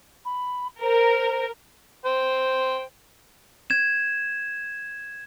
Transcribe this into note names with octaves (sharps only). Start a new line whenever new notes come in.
B5
A#4 C5
C5 G5
G#6 E7